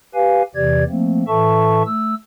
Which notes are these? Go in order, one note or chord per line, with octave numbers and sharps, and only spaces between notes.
G4 B4 F5 G#5
E2 C3 E3 G4 D5 G#6
F3 A3 A#3 C4
A2 E3 A4 E5 A5 C#6
A3 E6